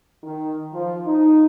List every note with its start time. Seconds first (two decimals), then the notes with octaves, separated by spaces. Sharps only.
0.23 D#3
0.73 F3
1.07 D#4